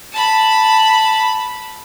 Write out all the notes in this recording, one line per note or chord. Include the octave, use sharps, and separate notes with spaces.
A5 B5